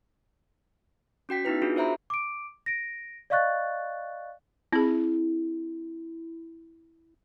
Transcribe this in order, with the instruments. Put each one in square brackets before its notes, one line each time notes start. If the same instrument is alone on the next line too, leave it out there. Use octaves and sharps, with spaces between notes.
[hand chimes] C#4 F#4 G5 B6
B3 D#4 E4 B4
D4 F4 F#4 G#4
A#4 C5 E5 A#5 B5
[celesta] D6 D7
A#6 D7
D5 D#5 F5 C#6 F#6 A6
[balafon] C4 G#4 [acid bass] E4